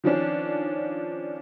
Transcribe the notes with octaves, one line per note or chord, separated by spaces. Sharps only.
D#3 F3 C#4 D4